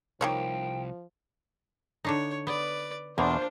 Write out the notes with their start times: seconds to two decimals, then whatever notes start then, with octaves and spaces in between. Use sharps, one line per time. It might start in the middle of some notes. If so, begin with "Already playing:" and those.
0.21 C2 D#3 F3 A#3 C#5 G5
2.05 D3 D4 D#4 C#5
2.47 B3 B4 D5
3.18 E2 B2 A#3 D4 F4 C5 F5